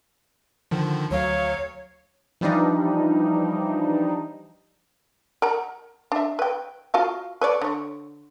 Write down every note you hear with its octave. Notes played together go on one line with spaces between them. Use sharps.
D3 D#3 F3
D2 F#3 C#5 F5
E3 F3 G3 D4 D#4
A#4 F#5 A#5
D4 E5
B4 G5
F4 F#4 F5
B4 C#5 D5
D3 C#5